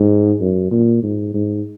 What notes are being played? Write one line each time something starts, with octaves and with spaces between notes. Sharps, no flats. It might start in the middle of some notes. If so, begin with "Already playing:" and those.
Already playing: G#2
F#2
A#2
G#2
G#2